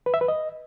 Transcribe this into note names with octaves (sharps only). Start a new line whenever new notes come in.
B4
E5
B4
D#5